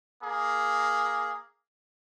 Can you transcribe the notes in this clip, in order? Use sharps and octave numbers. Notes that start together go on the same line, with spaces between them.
A#3 G#4